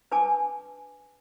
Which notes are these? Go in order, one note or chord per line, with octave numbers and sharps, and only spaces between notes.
D4 B4 G#5 A5 D6